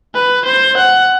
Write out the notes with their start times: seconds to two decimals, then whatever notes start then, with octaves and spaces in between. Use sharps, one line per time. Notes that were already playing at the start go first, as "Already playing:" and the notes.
0.14 B4
0.45 C5
0.77 F#5